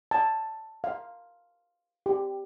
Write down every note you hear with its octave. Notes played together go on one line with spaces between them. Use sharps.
A5
F5
G4